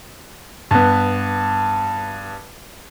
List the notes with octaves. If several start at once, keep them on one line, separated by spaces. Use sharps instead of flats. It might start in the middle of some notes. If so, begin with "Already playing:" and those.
G2 B3